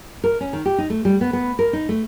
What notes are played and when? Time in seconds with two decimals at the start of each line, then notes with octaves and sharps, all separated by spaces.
0.24 A#4
0.41 C#4
0.53 D#3
0.66 G4
0.78 D#4
0.90 A3
1.05 G3
1.21 B3
1.33 B3
1.59 A#4
1.73 D#4
1.89 A3